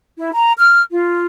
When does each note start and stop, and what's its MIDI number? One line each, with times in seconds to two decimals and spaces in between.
0.17 0.30 64
0.33 0.52 82
0.57 0.80 89
0.92 1.26 65